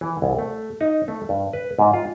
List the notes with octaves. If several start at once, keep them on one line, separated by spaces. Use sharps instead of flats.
E3
C2
A3
D#4
A3
G2
B4
G#2
F4